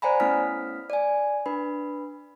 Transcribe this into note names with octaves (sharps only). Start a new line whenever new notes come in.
C5 D5 F#5 G#5 A#5 B5
A3 B3 C#4 E4 F6 B6
D5 G#5
D4 B4 B5